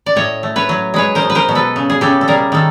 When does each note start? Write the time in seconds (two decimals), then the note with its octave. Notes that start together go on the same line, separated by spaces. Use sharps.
0.06 D5
0.16 A2 C#5 D#5
0.43 A3
0.56 B4 C#5
0.69 F#3
0.94 G#3 B4 C#5
1.15 A#4 C5
1.22 B2
1.30 B4
1.35 A#4 C5
1.49 B2
1.55 A4 B4
1.76 C#3
1.90 G#4
2.01 C#3 G4 A4
2.21 A4
2.28 G3 G#4 A#4
2.52 D#3 A4